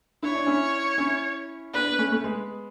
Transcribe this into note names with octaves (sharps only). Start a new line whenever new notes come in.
E4 C#5
D4
C#4 E4
C#4 E4
B3 D4 B4
B3
A3 C#4
A3
G#3 B3